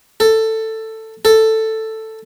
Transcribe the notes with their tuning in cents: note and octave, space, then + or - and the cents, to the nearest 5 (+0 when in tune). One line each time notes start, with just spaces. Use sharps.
A4 +10
A4 +5